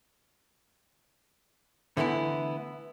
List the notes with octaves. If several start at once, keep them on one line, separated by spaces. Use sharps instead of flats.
D3 E3 A3 B3 E4